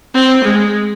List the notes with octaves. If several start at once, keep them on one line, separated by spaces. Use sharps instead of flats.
C4
G#3